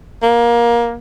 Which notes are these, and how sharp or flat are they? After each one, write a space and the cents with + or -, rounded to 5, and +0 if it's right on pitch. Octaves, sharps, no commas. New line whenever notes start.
A#3 +20